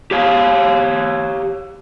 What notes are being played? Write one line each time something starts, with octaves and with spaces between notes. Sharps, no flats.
G4 C#5 F5